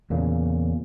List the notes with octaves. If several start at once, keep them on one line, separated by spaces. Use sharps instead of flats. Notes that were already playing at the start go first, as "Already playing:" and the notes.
E2 A#2 C#3